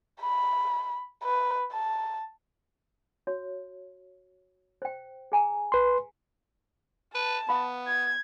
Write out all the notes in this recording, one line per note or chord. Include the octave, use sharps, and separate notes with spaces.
B5
B4
A5
F#4 C#5
C5 G5
G#4 G#5 A#5
B4 C6
B4 A5
B3 F5 B5
G#6